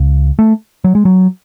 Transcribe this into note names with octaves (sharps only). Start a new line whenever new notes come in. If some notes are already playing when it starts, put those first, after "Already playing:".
Already playing: C#2 C#3
A3
F#3
G#3
F#3